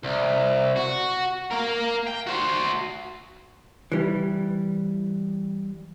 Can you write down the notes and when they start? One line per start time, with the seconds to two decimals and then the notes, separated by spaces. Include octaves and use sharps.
0.03 C2
0.76 F#4
1.52 A#3 A#4
2.07 G5
2.27 F#4 C5
3.92 E3 G3